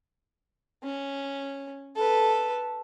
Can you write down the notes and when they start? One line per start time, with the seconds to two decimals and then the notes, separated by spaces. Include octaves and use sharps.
0.84 C#4
1.95 A4 B4